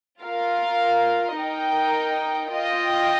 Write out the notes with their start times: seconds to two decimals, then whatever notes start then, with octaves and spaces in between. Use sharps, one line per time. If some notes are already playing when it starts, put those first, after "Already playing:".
0.21 F4 A#4 F5
1.36 D#4 A#4 D#5 G5
2.51 F4 D#5 G5